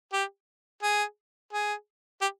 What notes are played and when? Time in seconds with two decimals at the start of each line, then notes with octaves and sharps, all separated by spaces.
0.13 G4
0.83 G#4
1.53 G#4
2.22 G4